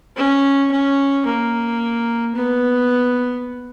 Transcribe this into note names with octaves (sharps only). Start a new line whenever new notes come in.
C#4
C#4
A#3
B3